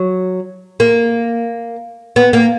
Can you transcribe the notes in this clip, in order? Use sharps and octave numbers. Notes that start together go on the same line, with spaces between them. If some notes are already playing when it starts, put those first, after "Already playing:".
Already playing: F#3
A#3
B3
A#3